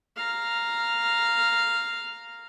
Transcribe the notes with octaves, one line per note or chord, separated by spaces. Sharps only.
F5 A#5